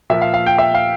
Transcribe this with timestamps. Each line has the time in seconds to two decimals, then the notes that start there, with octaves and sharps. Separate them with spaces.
0.10 A#2 F3 E5
0.22 F5
0.34 F5
0.46 G5
0.58 E5
0.74 F5